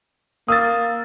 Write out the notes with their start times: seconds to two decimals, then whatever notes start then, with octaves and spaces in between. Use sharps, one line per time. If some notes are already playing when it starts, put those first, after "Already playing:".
0.48 A#3 D#6 E6 A6